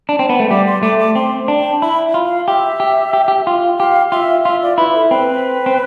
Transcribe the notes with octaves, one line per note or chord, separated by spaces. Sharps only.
D4
C4
B3
A3
G3 D6
C6
A3 D6
D6
C4 C6
D4
G5
E4 B5
F4
F5
G4 E5
G4
G4
G4
F4
G4 F5
F4 E5
F4 E5
D5
E4 B4
A4
C4 B4
C4